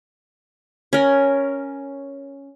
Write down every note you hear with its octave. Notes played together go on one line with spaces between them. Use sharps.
C#4 A#4